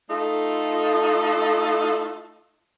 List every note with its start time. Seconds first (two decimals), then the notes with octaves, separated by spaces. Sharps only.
0.10 A3 D#4 F4 A4